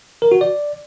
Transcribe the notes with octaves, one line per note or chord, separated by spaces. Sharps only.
A#4
F#4
D5